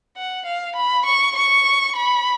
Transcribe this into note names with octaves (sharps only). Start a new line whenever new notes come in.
F#5
F5
B5
C#6
C#6
B5